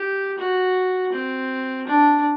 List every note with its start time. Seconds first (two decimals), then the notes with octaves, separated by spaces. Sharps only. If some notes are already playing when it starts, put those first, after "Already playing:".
Already playing: G4
0.38 F#4
1.13 C4
1.88 D4